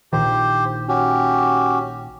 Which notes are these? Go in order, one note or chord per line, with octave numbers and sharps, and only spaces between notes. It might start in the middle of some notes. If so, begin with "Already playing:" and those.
A#1 A#2 D#3 G4 C5
C#4 F#4 G4